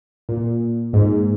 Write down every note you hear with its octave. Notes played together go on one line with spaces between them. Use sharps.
A#2
G#2